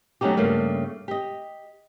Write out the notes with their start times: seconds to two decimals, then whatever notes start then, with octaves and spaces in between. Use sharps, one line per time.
0.21 F#3 A3 C#4 D#4 F#4 G4
0.37 G2 C#3 A3 A#3
1.08 G4 D#5